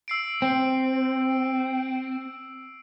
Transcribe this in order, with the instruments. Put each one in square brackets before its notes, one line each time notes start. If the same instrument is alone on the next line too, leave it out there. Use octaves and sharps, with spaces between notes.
[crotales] E6 C7 D7
[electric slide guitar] C4